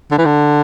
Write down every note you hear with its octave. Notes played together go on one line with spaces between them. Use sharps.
D3
E3
D3